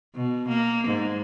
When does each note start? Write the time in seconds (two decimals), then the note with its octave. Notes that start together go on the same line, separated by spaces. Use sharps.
0.15 B2
0.48 A#3
0.87 G#2